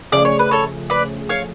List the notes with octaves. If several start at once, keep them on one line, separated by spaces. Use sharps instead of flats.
C#3 F3 A3 C#4 G#4 D5
C#5
B4
A4 C#5
B4 D5
C#5 F5